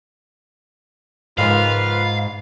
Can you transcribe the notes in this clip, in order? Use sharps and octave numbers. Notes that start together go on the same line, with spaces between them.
C#2 G#2 D#3 F3 F4 B4 F5